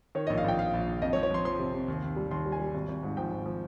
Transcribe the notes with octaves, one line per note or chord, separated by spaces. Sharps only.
D#3 C#5
A#1 D#5
F5
A#1 G5
A#1 F5
A#1
A#1
F2 D#5
C#5
F3
C#5
F3 C6
F3 C6
C3
C3
D#2
D#2
G3
D#2 C6
G3
G#5
G3
G#1
G#1
G#2
F3 G5
G#1
F3